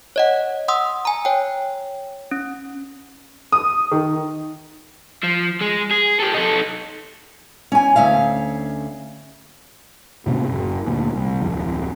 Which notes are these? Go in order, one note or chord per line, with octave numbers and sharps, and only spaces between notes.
C#5 D#5 F#5
F#5 C6 D#6 E6
G#5 A#5
C#5 G5
C#4
D#6
D#3
F3
G#3
G#4
G4 A4
D#4 A4
C#4 G#5
D2 C#4 E5 F5
A2 C3 A#3 C#4
F#1
D2 A#2
C2
D1 F2